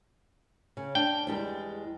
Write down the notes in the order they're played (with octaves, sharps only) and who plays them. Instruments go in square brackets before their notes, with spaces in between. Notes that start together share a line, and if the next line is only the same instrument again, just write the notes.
[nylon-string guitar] C#3
[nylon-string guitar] D4 [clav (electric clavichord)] G5
[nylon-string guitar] E2 G3 G#3